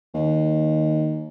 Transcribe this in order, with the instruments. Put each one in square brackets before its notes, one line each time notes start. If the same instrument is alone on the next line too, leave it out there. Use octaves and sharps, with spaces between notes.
[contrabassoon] D#2